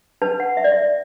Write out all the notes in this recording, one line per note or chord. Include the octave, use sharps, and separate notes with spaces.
D4 B4 A5
F#5
E5
D5
E5